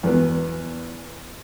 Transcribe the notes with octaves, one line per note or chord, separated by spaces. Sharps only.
E2 B3